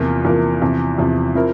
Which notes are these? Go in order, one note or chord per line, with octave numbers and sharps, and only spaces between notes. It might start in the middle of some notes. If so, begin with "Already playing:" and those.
Already playing: E2 C3 F3 A#3 F4
E2 C3 F3 A#3 F4
E2 C3 F3
E2 C3 F3
F3 C4 E4 A#4